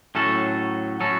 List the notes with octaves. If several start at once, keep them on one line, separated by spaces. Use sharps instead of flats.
A2 F#3 C#4 F#4 A4
A2 F#3 C#4 F#4 A4